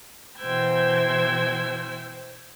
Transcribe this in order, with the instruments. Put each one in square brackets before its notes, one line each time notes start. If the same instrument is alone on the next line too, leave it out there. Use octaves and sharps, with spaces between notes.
[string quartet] B2 E3 C5 G5 E6 G#6